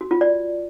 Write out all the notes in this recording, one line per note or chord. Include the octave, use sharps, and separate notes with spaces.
F#4
F4
D5